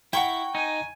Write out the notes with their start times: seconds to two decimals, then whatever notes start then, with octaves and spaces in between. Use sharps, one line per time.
0.13 E4 F#5 G5 A#5 C#6
0.55 D#4 G#5